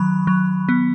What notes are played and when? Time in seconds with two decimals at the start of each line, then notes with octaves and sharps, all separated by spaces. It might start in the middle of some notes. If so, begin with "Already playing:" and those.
Already playing: D#3 F#3 B5
0.27 F#3
0.69 B3